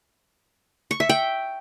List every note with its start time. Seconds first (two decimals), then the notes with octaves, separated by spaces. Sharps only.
0.91 C#6
1.00 E5
1.09 G5